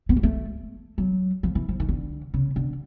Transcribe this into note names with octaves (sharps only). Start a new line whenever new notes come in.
B3
A#3
A3
F#3
F3
E3
F3
D#3
D3
C#3
D3